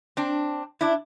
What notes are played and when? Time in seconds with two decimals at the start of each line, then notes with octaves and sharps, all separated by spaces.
0.17 C4 D4
0.81 D4 E4